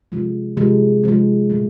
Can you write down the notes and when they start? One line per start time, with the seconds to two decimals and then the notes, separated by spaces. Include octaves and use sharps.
0.12 C3 F3 G#3
0.57 C3 F3 G#3
1.04 C3 F3 G#3
1.50 A#2 F3 A3